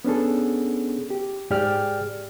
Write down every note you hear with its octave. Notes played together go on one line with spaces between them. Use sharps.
B3 C#4 D4 G#4 A4
G4
G#2 G4 G#4 D5 G5 F6